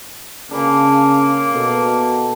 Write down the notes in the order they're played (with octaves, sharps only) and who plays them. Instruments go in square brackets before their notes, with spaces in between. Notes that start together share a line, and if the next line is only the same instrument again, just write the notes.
[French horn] C#3 [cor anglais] A#3 [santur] D4 B4 G#5
[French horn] B2 [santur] A4